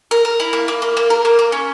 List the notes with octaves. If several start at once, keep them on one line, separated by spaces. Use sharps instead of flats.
A#4
A#4
E4
A#3
A#3
A#3
A#3
A#4
A#3
A#3
C#4